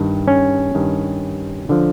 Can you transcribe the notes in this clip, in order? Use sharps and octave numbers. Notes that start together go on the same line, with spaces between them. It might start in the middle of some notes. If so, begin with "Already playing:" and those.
Already playing: G2 D#3
C#4
G2 D#3
D3 F3